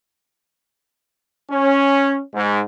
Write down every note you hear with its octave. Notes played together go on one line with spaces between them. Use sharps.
C#4
G#2